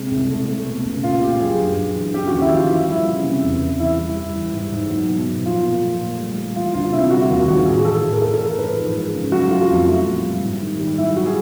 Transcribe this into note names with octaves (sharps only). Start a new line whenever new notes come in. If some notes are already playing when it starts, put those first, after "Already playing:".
Already playing: C3 G#3
C2
A3
A3
B2
C#2
A#2 F4
A#2 G4
F#3 G#4
G2
G2
E3
C#3 G4
D#2 F#4
E4
F3 F4
E3 E4
G3 E4
C#3
C3
E2
E2
E3 E4
G3
G3
E3
G#2
G#2
F#3
B2
B2
F3 F4
A#2
A3
A#2
G3
G3
E3 F4
D2 F4
C3 E4
G3 F#4
D#2 F4
D#2 F#4
A2 G#4
E3 A4
A2 G#4
A#4
E3 A4
A4
E3 A#4
G#2 B4
F3
G#3
C#3
F#3 F#4
A3 F4
F2 F4
G3 E4
A#2
G3
G#2
D#3
G3
F#3 E4
F#4
G#4